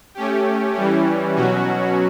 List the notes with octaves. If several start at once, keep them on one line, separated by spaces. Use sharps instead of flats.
A3 C#4 G4
E3 G3 C#4
B2 F#3 C#4 F#4